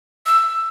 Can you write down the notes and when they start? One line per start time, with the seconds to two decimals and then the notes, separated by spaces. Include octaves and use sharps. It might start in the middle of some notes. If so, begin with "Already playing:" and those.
0.26 E6